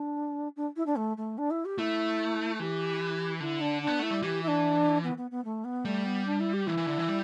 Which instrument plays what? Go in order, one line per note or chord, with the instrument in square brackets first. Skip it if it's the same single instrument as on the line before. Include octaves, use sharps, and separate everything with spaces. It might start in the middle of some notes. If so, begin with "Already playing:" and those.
Already playing: [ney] D4
D4
E4
D4
A3
A3
D4
E4
G4
[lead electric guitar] A3 [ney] E4
[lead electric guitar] E3 [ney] G4
[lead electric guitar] D3 [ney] E4
[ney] D4
[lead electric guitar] B3 [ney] D4
[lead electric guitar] A3 [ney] E4
[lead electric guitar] G3
[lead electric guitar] E3 [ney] G4
[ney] E4
D4
B3
B3
B3
A3
B3
[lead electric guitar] G3 [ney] A3
[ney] B3
D4
E4
G4
[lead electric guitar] E3 [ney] E4
[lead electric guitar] E3
D3
E3
G3